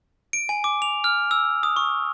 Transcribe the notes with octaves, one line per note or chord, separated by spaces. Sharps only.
D7
G#5
D6
F7
F6
E6
D#6
C#6